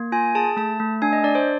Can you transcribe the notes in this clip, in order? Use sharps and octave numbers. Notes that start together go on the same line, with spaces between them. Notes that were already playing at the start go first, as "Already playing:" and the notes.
Already playing: A#3
F4 G#5
G#4 A5
A3 A5
A3
D4 G#5
D#5
D4 D5
C5